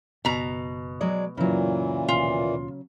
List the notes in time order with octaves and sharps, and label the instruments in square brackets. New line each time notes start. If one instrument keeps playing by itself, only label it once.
[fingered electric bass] F#1 [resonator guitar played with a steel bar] B2 A#5
[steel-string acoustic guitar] F#3 G#3 D5
[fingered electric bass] F#2 [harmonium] A#2 E3 [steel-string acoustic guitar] C#3 F#3
[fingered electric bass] D#2 B2 [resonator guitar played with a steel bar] F4